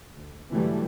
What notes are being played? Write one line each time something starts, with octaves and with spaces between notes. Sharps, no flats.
D2
G#2 D3 E3 F#3 G3 A3